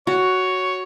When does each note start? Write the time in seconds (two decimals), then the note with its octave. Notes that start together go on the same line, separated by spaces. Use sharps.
0.07 F#4 C#5